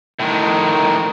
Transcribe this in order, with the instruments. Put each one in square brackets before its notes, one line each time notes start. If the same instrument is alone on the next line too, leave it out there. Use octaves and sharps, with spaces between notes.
[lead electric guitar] A2 D#3